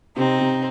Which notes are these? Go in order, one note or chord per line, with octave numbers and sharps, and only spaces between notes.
C3 C4 D#4
C3